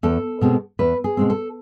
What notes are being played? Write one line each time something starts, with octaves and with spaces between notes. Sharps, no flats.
E2 A4
B2 G#3 C4
E2 B4
G#4
B2 G#3 C4
A4